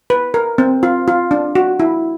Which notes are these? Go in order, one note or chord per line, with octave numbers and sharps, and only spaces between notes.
B4
A#4
C4
F4
F4
D4
F#4
E4